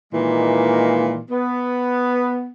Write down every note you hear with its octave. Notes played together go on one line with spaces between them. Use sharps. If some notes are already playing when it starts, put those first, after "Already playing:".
A#2 D#3 E3 G#3 A#3
B3